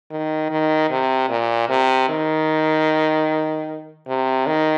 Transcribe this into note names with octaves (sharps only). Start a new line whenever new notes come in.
D#3
D#3
C3
A#2
C3
D#3
C3
D#3